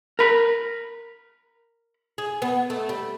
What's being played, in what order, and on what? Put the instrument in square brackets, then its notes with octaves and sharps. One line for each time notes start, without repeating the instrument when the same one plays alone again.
[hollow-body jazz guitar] A#4 B5
[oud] G#4
B3
A3
G3